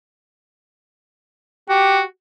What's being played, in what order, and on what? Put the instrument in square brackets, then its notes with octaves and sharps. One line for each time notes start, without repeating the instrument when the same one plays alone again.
[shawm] F#4 [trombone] G4